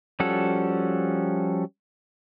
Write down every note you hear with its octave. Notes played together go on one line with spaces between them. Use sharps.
F3 G3 C#4 F#4 A4